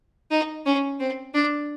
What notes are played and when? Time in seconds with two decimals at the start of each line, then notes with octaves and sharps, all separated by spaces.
0.31 D#4
0.66 C#4
1.00 C4
1.34 D4